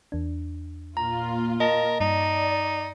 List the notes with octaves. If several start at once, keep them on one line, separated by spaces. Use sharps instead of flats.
E2 D4
A#2 F4 A#5
A#4 D#5 A5
G2 D#4 D5